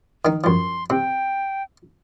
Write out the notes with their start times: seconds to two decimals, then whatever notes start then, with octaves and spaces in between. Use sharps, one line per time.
0.25 D#3 D#4
0.44 F#2 F3 C6
0.90 C3 G5